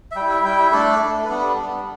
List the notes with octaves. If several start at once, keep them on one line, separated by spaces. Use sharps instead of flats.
E5
G3 G5
E4
E5
G3 E4 G5
E5
A3 D4 A4
A3 D4
B4
G3 B3 D4 A4
G3 B3 D4